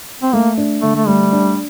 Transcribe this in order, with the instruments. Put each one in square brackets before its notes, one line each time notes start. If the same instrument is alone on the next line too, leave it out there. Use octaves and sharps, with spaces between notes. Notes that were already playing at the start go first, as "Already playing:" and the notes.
[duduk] C4
[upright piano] A3 [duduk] A#3
[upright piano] D4
[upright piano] D3 [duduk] A3
[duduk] A3
[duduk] G3 [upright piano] A3
[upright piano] D4